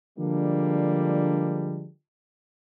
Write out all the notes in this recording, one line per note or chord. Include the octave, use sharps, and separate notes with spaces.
D3 F3 G3 G#3 A#3 D4